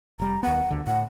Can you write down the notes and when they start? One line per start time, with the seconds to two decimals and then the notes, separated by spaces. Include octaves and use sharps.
0.20 F1 G3 A#5
0.43 D#2 B3 F#5
0.70 D2 D3
0.87 A2 F#5